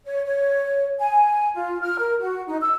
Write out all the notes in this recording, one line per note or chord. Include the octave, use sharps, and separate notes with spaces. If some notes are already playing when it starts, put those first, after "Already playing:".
C#5
C#5
G#5
F4
F6
A#4
F#4
D#4
E6